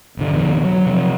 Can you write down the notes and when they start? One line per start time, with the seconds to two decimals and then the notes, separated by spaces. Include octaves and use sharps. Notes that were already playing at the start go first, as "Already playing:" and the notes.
0.17 G1 C2 D3
0.33 F2 B2 D3 D#3
0.64 F#3
0.86 C3 F3